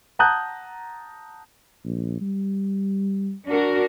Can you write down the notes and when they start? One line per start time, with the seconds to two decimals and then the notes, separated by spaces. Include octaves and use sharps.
0.19 F#5 A5 A#5 D#6 F#6 G6
1.84 A#1
2.21 G3
3.48 D4 F#4 A#4